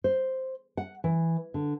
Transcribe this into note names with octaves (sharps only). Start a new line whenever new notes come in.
C5
F#5
E3
D3